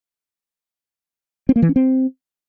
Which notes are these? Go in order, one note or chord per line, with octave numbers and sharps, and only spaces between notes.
C4
A#3
E3
C#4
C4